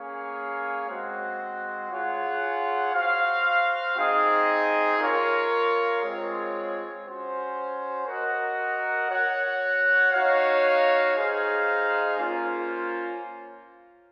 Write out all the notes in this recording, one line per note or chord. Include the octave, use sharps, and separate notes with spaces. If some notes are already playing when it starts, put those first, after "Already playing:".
Already playing: A#3 C#4 G#4 C#5 F5
G#3 C4 F#4 C5 F#5
F4 G#4 C#5 F#5
F#4 C5 F5
C4 D#4 G#4 D#5
F4 A#4 C#5 F5
G#3 C4 F4 G#4 C#5
C#4 F#4 C5
F#4 A#4 D#5 F#5
F#4 C#5 F#5
D#4 F#4 C#5 F5
D#4 G#4 C5 F5
A#3 C#4 F4 C5